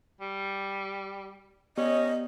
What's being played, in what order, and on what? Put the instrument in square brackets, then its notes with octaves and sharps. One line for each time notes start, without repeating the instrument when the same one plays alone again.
[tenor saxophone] G3
[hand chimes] B3 G4 D5 [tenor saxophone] C#4 [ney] D#5